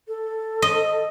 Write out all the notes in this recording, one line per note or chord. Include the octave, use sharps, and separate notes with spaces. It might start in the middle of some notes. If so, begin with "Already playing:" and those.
A4
D#5